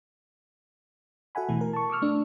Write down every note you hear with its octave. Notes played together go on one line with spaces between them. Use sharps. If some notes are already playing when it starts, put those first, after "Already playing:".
F#4 A4 E5 F#5 G#5 B5
B2 E3 A3
A#4
A5 C#6
C#6 D6 E6 F6
A3 D4